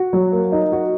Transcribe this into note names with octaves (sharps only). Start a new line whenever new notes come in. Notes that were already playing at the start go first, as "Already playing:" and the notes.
Already playing: F#4
F#3
A#3
D#4
F#4